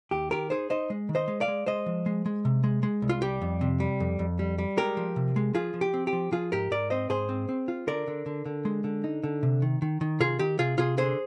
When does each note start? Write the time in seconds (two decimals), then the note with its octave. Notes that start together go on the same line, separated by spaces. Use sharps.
0.11 D#2 G4
0.31 D#3 G4 A#4
0.50 D#4 G#4 C5
0.70 D#4 C5 D#5
0.90 G#3
1.09 D#3
1.15 C5 D#5
1.28 G#3
1.41 D5 F5
1.48 G#3
1.66 G#3 C5 D#5
1.86 F3
2.06 G#3
2.26 G#3
2.45 C3
2.64 G#3
2.83 G#3
3.02 C2
3.09 F4
3.22 G3 G4
3.42 F2
3.61 C3
3.80 G3
4.00 F2
4.19 F2
4.39 G3
4.59 G3
4.77 G#3 G4 A#4
4.97 F3
5.16 C3
5.36 G#3
5.54 F3 F4 G#4
5.74 F3
5.81 G4
5.94 C4
6.07 G4
6.13 F3
6.32 F3 F4 G#4
6.52 G#2 G4 A#4
6.71 G#2 A#4 D5
6.90 C4 C5 D#5
7.09 G#2 G#4 C5
7.29 C4
7.49 C4
7.68 F4
7.87 D3 A#4 D5
8.07 D3
8.26 D3
8.46 D3
8.65 G#3
8.84 D3
9.04 D#4
9.24 D3
9.43 C3
9.62 D#3
9.82 D#3
10.01 D#3
10.20 C3 F4 G#4
10.39 D#3 G4
10.59 C3 F4 G#4
10.78 C3 F4 G#4
10.98 D3 G#4 C5